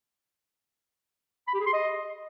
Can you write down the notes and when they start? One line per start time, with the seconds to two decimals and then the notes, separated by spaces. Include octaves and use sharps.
1.47 B5
1.54 G4
1.60 G#4
1.67 C6
1.73 D#5